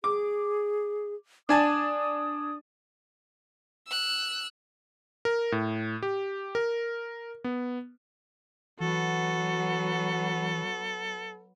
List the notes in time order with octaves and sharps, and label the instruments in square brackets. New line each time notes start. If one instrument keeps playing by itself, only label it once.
[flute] G#4 [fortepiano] D6
[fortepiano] D4 G#5 A5 [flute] D#6
[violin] E6 F#6
[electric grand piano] A#4
A2
G4
A#4
B3
[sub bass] E3 [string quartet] F#3 B3 [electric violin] F#4 [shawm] A4